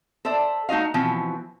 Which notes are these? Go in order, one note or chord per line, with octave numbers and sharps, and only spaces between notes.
A4 C5 D5 E5
A3 D#4 F#4 D#5 F5
B2 E3 F3 C4